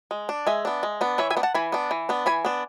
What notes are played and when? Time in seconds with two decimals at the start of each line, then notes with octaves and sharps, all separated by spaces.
0.11 G#3
0.29 D4
0.47 G#3 E5 G#5
0.65 B3 D4
0.83 G#3
1.01 B3 D4
1.18 E3 C#5 E5
1.30 E5 G#5
1.37 B3 D4
1.43 F#5 A5
1.54 E3 G#5 B5
1.72 B3 D4
1.91 E3
2.09 B3 D4
2.26 E3 G#5 B5
2.45 B3 D4